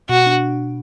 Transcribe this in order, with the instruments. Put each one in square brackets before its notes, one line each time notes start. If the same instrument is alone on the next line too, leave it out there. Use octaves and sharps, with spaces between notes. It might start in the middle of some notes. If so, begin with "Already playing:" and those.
[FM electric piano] B2 [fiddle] F#4
[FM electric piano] D4